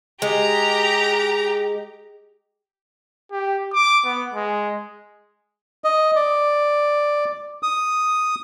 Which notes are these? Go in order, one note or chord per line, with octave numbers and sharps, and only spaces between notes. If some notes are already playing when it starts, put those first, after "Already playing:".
G#3 G4 A#5
G4
D6
B3
G#3
D#5
D5
D#6